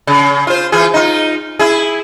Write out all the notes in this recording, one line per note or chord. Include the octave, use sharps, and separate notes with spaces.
C#3
F4 C5
E3 F4 G#4
D#4 F4
E4 G#4